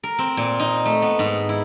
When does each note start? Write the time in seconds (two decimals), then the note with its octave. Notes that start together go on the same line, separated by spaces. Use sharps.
0.03 A#4
0.19 C4
0.37 A#2
0.60 D#4
0.86 A3
1.02 B3
1.19 G#2
1.49 E4